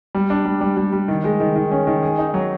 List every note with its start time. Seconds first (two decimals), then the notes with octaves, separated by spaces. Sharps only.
0.15 G3
0.30 D4
0.45 G3
0.61 G3
0.77 G3
0.93 G3
1.08 D#3
1.24 G#3
1.40 D#3
1.56 D#3
1.71 C#4
1.87 D#3
2.03 G#4
2.18 D#4
2.34 F#3